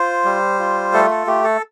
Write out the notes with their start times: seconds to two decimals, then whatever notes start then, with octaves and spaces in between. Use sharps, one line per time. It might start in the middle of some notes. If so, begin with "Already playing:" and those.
Already playing: F4 C5
0.25 G3
0.59 F4
0.93 A3 A4
1.10 A4
1.27 A3 G4
1.44 A4